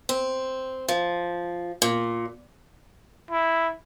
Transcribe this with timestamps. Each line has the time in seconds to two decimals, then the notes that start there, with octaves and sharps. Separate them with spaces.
0.09 C4
0.88 F3
1.82 A#2
3.31 E4